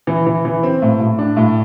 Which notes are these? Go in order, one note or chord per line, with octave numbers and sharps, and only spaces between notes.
E3
E3
E3
C4
A2
A2
D4
A2